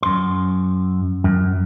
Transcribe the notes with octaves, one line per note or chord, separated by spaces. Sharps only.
F#2 C6
F#2